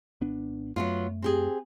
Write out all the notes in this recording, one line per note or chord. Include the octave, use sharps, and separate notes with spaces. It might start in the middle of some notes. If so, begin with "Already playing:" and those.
G#1 B3 D4
F#2 F#3 A3 B3 F4
C4 G4 G#4